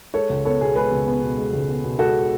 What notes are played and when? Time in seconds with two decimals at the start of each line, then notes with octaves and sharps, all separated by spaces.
0.14 G#3 A4 C#5
0.30 C#2
0.45 B3 A4 C#5
0.61 B2 G#4
0.76 G#3 G#4 B4
0.92 C#2
1.06 B3
1.22 B2
1.38 G#3
1.53 C#2
1.68 B3
1.84 B2
1.99 G#3 F#4 A4